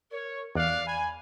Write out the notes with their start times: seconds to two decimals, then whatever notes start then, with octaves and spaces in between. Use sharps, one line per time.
0.11 A#4 C#5
0.55 E2 D5 F5 F#6
0.86 G#5 B5